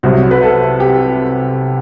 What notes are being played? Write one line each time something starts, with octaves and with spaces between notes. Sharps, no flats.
C2 C3 F#3 F#4
B4
A4
G4